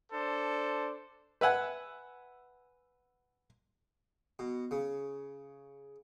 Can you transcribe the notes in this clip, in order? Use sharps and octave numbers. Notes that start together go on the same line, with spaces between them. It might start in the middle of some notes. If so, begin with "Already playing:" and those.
D4 A4 C5
B4 E5 F#5 G#5
B2
C#3